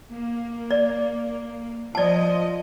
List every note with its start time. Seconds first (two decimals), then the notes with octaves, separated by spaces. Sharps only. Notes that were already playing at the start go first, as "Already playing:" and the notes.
0.13 A#3
0.71 D5
1.95 F3 D5 D#5 A5